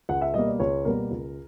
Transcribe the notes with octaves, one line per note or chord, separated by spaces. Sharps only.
C#2 F#5
E5
B2 G3 A#3 D#5
D5
C#2 C#5
B2 G3 A#3 A#4
C#2